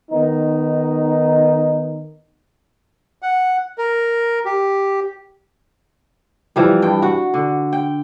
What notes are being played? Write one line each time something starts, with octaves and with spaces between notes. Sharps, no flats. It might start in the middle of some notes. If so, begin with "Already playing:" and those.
D#3 B3 D#4
F#5
A#4
G4
E3 F3 G3
G2 G5
F#4
D3
G5